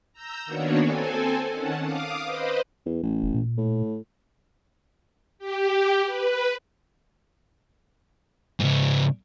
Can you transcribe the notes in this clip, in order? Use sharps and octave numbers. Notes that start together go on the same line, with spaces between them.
A#5 E6 G6
D#3 A#3 B3 D4 F#4 C#5
C4 A4 G#5
D#3 C#4 F#5 A5
F5 D6 D#6
B4 C5 D#5
E2
A1
E1
A#2
A2
G4
B4
G#2 C#3